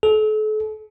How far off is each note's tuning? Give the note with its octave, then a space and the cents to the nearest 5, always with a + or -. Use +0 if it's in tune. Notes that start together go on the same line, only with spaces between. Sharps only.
A4 -40